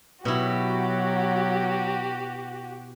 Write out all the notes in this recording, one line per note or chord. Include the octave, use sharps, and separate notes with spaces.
B2 F#3 E4 F#4 G4